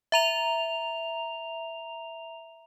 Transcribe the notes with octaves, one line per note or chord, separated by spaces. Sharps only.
E5 A#5 F7